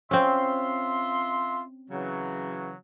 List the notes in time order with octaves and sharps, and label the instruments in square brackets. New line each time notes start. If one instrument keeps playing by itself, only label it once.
[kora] C4 C#4 [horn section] F4 E5 C6
[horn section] C#3 E3 F#3